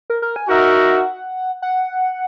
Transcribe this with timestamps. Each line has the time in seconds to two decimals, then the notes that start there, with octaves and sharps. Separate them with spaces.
0.10 A#4
0.22 A#4
0.36 G#5
0.48 D#4 F#4 A#4 E5 F#5
1.62 F#5